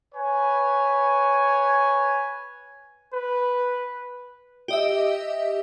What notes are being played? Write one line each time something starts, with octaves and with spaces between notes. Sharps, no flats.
B4 C#5 G#5
B4
G4 D#5 E5